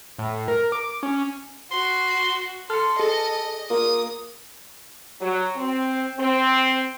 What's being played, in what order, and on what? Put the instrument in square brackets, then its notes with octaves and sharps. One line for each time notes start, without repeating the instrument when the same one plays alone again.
[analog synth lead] A2
A#4
D6
C#4
[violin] F#4 [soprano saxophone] C6
[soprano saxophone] A4 [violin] C6 [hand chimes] F6 C#7
[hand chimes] G#4 [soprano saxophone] A4 [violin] D#5
[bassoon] A#3 [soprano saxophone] F4 [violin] D#6
[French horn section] F#3
C4
C4